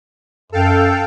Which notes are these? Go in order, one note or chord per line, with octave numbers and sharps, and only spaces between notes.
F#2 A4 F5 G5